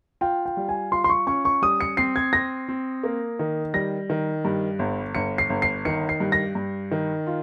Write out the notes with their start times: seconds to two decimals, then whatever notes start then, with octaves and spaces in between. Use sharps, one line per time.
0.21 F4 G5
0.46 G5
0.57 G3
0.69 G#5
0.92 F4 C6
1.04 C6
1.10 C#6
1.27 C#4 C#6
1.45 C#6
1.62 G3 D#6
1.81 C#7
1.97 C4 C7
2.16 G#6
2.33 C4 A#6
2.68 C4
3.04 A#3
3.39 D#3
3.74 G3 A#6
4.10 D#3
4.45 G2
4.79 G1
5.15 G1 C#7
5.38 C7
5.50 G1
5.62 C7
5.85 D#3 C#7
6.09 C7
6.20 G2
6.32 A#6
6.55 G2
6.91 D#3
7.27 F4